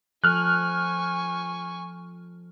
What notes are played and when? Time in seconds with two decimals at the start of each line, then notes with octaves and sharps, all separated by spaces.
0.24 F3 A4 G#5 C#6 F6 F#6